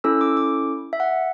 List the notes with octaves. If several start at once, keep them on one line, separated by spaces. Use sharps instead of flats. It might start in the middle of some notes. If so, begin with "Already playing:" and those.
C#4 E4 A4 E6
D6
D6
E5
F#5